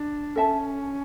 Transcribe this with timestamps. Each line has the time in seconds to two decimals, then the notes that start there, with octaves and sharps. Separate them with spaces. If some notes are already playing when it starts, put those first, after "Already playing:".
Already playing: D4
0.36 C#4 A4 E5 A5